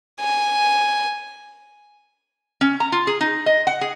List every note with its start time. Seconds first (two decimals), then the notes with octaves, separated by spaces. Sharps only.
0.20 G#5
2.61 C#4
2.80 A#5
2.92 F4
3.07 G#4
3.21 D#4
3.46 D#5
3.67 F#5
3.81 G#4